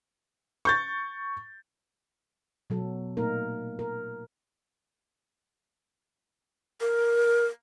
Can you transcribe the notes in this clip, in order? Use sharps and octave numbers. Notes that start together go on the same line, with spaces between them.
C#6 G6 A6
B2 F#3 A4
A#2 A3 A#3 D#4 A#4
A#4
A#4